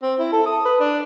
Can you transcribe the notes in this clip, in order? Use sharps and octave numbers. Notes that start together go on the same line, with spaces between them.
C4
E4
A4
D#6
B4
D4